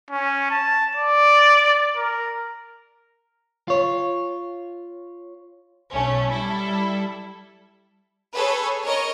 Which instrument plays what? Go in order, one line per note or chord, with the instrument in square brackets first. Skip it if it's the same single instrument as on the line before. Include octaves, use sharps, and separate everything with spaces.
[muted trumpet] C#4
A5
D5
A#4
[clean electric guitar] F4 C#5
[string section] B1 A3 C#4
G3 E4 A4
[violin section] G#4 A4 B4 C#5
A#4 C#5 D#5